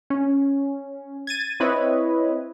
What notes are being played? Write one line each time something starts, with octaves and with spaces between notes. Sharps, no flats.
C#4
G#6 A6 D#7
C4 E4 B4 C#5 D#5